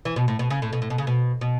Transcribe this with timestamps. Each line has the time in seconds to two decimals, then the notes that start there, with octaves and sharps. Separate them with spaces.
0.05 E3
0.16 B2
0.28 A2
0.39 B2
0.50 C#3
0.62 A2
0.73 B2
0.82 A2
0.90 B2
0.98 C#3
1.07 B2
1.41 B2